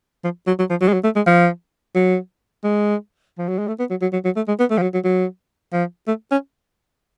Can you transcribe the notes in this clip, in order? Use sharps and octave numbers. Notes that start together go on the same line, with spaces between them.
F3
F#3
F#3
F3
F#3
G#3
F#3
A3
G#3
F3
F#3
G#3
F3
F#3
G#3
A3
B3
F#3
F#3
F#3
F#3
A3
G#3
B3
A3
F3
F#3
F#3
F#3
F3
A3
C#4